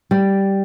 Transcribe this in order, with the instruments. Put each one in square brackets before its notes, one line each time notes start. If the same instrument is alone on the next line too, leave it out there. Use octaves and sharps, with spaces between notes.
[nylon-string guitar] G3